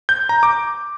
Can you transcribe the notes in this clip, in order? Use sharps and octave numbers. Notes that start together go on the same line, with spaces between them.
G6
A#5
D6